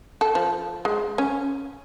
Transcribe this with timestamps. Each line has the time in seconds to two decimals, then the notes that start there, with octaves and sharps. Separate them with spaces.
0.21 A4
0.35 F3
0.85 G#3
1.18 C#4